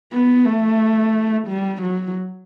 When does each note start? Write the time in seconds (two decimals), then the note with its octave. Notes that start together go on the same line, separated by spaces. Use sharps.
0.13 B3
0.46 A3
1.48 G3
1.82 F#3